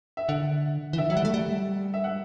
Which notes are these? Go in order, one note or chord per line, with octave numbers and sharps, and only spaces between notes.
E5
D3 F#5
E3
D3 E5
F#3 E5
G3 F#5
A3
G3
E5
F#5